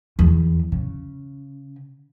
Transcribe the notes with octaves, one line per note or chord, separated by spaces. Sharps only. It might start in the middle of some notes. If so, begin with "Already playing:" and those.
E2
C#3